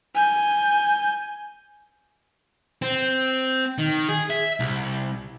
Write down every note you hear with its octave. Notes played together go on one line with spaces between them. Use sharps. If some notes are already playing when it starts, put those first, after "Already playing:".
G#5 G6
C4
D#3
G#4
E5
C2